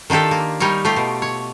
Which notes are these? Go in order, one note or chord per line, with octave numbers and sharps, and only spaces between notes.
D#3 D4 F4 G4 A4
A#3
G3 D#4 A#4 C#5
A3 F4 G4
B2
C#5